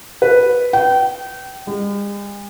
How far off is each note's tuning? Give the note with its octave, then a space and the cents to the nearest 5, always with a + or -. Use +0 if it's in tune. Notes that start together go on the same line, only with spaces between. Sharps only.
B4 -5
G5 -30
G#3 -45